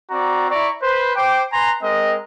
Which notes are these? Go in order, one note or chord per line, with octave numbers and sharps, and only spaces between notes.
C4 F#4 D5 A#5
E4 D5 A#5 C#6
B4 C5
C5 G5 D6
B4 G#5 A#5 C6
G#3 C4 A#4 D#5